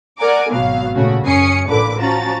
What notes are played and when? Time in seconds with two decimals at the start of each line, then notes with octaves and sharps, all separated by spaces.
0.18 A#4 D5 F#5 G#5 A#5 D6
0.49 G#1 B2 F#3 B3 F5
0.95 A#2 C#3 A3 F#4
1.23 F#2 C#4 G#5 D#6 C7 C#7
1.68 A1 A#2 D3 B4 D6
2.00 F3 C#4 F#4 A#5 A6